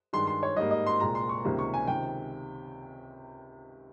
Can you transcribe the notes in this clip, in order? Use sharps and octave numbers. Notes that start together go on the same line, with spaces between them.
G2 D#3 G#3 C6
C6
C#5
G#2 G3 A#3 D#5
D#5
C6
C2 A#2 G#3 A#5
C6
C#6
C#2 C3 D#3 G3 A#3
C#6
G#5
C#2 C3 D#3 G5